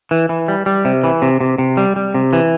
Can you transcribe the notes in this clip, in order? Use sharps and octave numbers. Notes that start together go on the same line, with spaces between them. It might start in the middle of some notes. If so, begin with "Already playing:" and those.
E3
E3
G3
G3
C3
E3
C3
C3
C3
G3
G3
C3
E3